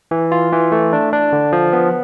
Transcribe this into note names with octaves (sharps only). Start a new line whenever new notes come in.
E3
F4
E3
A3
D4
D4
D3
F3
B3